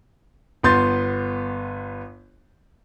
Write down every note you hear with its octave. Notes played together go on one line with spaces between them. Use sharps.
G1 B3 C6 G6 A6